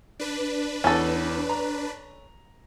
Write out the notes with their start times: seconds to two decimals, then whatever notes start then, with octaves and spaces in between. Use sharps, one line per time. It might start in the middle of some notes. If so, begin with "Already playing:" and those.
0.20 D4 B4
0.84 E2 C#4 A4
1.49 A#5